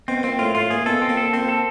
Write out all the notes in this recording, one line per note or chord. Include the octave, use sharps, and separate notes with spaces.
B2 C4
A#2 C4
A2 F4
A2 F4
A#2 G#4
B2 A4
C4
A#2
A4
A#2 C4
A4